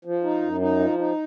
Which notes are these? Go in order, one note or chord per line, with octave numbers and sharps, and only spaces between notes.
F3
D#4
F#2
D#4
F3
D#4